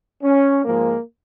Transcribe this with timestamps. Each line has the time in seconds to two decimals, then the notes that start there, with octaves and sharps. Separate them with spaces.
0.23 C#4
0.64 G#2 F3 G#3 A#3